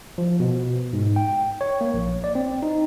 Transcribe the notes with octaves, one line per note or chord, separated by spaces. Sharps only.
F3
B2
G#2
G5
C#5
A#3
A#1
D5
C4
D#4